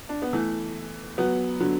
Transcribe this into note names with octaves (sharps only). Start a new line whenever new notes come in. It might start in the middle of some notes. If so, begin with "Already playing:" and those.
D4
B3
E3 A3
F#3 B3
D3 F#3